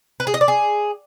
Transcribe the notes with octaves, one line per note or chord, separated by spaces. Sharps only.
B4
G#4
D#5
D5
G#4